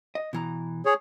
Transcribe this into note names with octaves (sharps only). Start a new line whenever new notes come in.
D#5
B2 E3 A#5
G#4 C#5